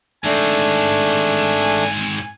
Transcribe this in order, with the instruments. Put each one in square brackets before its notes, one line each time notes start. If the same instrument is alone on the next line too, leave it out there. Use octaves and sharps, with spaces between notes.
[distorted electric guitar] G#2 C4 [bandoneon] A3 D4 [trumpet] G#5